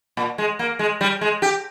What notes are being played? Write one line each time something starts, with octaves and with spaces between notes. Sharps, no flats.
A#2
G#3
A#3
G#3
G3
G#3
G4